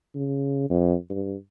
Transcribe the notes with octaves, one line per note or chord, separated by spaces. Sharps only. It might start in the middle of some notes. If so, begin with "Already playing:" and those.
C#3
F2
G2